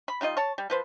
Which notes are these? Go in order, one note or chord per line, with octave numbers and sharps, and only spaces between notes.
B5
G3 D#4 F4 D#5
C#5 A5
G3
F3 B4 C5